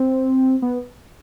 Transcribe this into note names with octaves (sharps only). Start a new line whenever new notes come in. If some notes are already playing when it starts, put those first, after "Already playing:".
Already playing: C4
B3